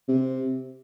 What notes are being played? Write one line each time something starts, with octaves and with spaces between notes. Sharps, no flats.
C3